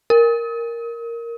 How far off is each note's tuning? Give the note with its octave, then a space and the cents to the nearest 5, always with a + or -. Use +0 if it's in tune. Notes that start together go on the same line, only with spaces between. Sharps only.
A#4 +0